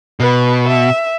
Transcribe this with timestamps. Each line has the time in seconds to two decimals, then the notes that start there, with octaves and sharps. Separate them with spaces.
0.20 B2 B4
0.68 E5